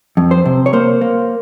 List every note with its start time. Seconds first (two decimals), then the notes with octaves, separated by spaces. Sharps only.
0.17 F2
0.31 C5
0.45 C3
0.66 C#5
0.73 A#3 C5
1.01 A#3